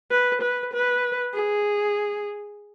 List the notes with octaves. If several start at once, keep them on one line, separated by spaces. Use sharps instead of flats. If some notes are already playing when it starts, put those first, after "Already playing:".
B4
B4
B4
G#4